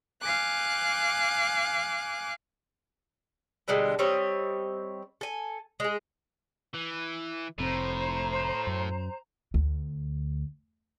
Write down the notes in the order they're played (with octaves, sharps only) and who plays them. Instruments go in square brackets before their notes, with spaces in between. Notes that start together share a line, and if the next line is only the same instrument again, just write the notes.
[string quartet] F5 G#5 D6 F#6
[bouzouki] B2 D3 G3 G#3
G3 C4 C#5 D#5
A4 G#5
G#3 G#4
[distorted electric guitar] E3
[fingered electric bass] F1 C4 [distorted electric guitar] A2 [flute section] C5 A#5
[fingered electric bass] F#2
[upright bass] D2